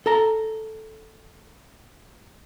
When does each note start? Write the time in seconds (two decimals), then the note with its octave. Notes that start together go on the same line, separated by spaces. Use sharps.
0.06 A4 A#5